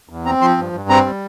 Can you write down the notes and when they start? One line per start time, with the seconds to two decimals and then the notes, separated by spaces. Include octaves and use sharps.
0.09 E2
0.25 C4 A#5
0.41 F3 C6
0.57 G2
0.73 G2
0.89 C4 A#5
1.05 G3